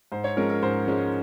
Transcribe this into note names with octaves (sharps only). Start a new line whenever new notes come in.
G#2 C5
C#5
F3 G#3 C#4 A#4
A#4
G#2 C5
F3 G#3 C#4